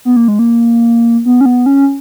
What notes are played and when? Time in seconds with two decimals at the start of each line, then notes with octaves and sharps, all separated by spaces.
0.05 B3
0.16 A#3
0.28 G#3
0.39 A#3
1.25 B3
1.41 C#4
1.46 B3
1.66 C#4